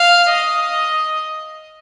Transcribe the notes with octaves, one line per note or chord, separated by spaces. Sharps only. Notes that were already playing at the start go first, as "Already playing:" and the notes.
Already playing: F5
D#5